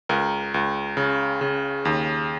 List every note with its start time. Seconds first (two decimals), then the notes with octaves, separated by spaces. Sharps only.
0.09 C#2 A#4
0.54 C#2
0.97 C#3
1.41 C#3
1.85 D#2